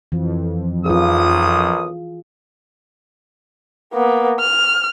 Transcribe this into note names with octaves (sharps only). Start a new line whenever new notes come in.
F2 E3
B1 D#3 F4 G#4 D#6
A#3 B3
F6